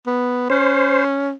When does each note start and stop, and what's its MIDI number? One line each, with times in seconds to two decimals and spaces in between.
0.07 0.50 59
0.50 1.32 61
0.50 1.04 72